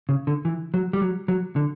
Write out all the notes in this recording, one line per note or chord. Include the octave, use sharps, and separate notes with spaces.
C#3
D3
E3
F#3
G3
F#3
F#3
D3